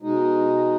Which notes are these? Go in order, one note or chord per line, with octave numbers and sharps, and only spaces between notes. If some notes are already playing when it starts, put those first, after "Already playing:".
B2 G#3 D#4